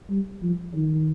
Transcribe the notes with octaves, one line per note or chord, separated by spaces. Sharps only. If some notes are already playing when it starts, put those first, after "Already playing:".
G3
F3
D#3